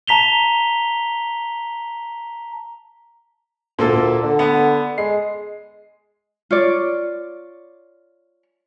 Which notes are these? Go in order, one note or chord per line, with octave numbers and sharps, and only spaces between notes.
A5 A#5 B6 F7 G7
D2 A#2 A#3 A4
D3
B3
G#3 C7
F4 C#5 D5